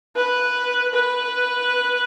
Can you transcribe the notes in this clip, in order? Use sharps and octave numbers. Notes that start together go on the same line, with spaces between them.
B4
B4